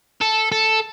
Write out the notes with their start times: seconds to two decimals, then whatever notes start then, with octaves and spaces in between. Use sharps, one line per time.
0.21 A4
0.52 A4